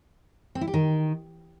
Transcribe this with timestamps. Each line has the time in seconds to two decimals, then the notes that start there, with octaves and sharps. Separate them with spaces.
0.55 C4
0.61 E4
0.67 G4
0.74 D#3